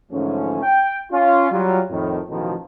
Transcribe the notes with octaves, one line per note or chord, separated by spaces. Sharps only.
G#2 D3 E3 F3 A3 C#4
G5
C#4 F4
F#3 G3 F4
F2 A2 D#3
A1 B2 D#3 F3